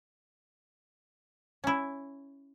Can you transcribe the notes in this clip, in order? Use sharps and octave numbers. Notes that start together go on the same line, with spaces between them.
C#4 E4